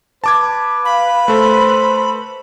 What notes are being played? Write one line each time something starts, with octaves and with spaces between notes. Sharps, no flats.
B4 A5 D6 G#6
F5 B5
A3 A4 C5